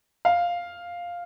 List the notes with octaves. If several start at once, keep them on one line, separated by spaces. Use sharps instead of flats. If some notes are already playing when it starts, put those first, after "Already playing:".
F5